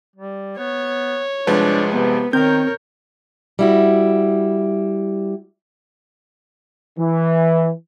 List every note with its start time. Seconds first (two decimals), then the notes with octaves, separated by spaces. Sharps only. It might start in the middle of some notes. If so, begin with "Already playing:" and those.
0.16 G3
0.58 B3 C#5
1.47 C2 F3 G#3 D4 B4
1.91 C3 B3
2.33 D#3 C4 A#4 C#5 G6
3.59 G3 E4 F#4
6.99 E3